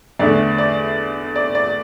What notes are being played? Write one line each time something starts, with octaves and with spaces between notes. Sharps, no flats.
E2 D3 A3 D5
D5
D5
D5